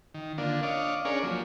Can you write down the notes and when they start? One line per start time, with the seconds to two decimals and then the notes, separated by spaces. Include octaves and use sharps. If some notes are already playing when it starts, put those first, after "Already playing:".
0.14 D#3
0.38 D3 A#3 D4 F4
0.63 D4 C#5 D#5 F5 D6
1.05 C#4 D4 G#4 A#4 C#5 D5
1.24 F3 F#3 A#3